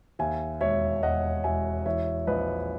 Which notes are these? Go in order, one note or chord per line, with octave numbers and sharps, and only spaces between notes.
D#2 E5 G#5
E1 C#5 E5
E1 D#5 F#5
E1 E5 G#5
E3 C#5 E5
A#1 B4 D#5